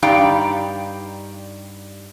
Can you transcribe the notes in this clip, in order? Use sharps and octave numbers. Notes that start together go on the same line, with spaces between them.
G2 D#4 G4 D5 F5 G5